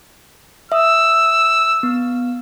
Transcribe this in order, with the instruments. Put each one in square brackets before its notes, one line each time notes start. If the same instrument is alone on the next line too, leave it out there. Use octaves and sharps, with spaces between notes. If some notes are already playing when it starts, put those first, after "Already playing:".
[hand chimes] E5 D#6 [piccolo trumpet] E6
[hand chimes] B3